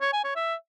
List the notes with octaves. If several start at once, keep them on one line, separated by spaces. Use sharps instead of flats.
C#5
G#5
C#5
E5